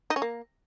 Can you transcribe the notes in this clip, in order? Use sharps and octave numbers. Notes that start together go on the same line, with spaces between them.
D#4
C#4
A#3